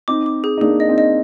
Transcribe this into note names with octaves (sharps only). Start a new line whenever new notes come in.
C4 D#4 D6
D6
G#4
D#4
A#3 D4 G#4
D#5
C4 D#4
D#5